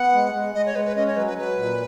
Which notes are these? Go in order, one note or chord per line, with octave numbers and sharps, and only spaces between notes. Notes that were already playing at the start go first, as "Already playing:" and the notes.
Already playing: B3 F#5
G#3
G#3
G#3 D#5
C#5
G#3 B4
B4
C#4 D#5
C#5
F#3 B4
B4
F#3 B4
A#2